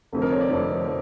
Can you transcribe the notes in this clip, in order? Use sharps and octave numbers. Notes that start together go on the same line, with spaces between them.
F1 F2 D3 F3
A#4
C#5
D5
F1 F2 D3 F3
F3